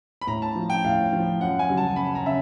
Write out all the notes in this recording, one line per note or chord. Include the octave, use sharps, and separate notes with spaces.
B5
A2 A#5
A5
F3
G5
A2 F5
F3
F#2 F#5
G#5
C#3 F#3
A5
F#2 B5
A#5
C#3 E5